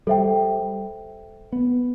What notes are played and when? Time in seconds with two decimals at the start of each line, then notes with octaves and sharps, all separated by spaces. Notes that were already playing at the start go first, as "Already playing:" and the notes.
0.07 G3 A4 C5 E5 G5
1.53 B3